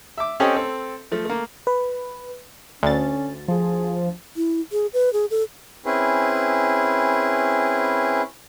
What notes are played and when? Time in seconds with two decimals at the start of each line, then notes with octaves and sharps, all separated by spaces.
0.18 E5 D6
0.40 C4 C#4 G4 A4 C#5 D#5
0.55 C4 A4
1.12 F3 A3
1.25 A3 A#3
1.67 B4
2.83 D2 C#4 A6
3.48 F3 G#4
4.36 E4
4.72 G#4
4.94 B4
5.13 G#4
5.31 A4
5.86 C4 C#4 E4 G#4 B4